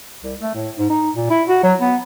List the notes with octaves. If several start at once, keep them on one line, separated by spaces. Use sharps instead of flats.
C2
A3
A2
G#2
D#4
A#2
E4
F#4
F#3
B3